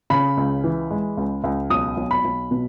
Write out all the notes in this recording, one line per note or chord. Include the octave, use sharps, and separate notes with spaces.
C#3 B5
C#2
E3
G#3
C#2
C#2
B1 D#6
B1
B5
B1
B2